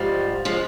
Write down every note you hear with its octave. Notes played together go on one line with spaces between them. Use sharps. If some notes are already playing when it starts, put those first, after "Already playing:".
Already playing: G#2 F3 G3
F3 G#3